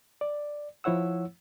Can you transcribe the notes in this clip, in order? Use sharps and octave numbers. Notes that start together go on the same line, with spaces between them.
D5
F3 E4 C#5 F#5 E6